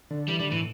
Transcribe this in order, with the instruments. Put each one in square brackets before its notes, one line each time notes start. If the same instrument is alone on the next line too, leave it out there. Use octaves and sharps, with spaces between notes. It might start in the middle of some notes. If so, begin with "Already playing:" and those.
[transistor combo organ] D3
[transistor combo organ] E3 [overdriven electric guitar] G3
[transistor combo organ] D3 [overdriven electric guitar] G3
[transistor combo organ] A2 [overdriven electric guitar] E3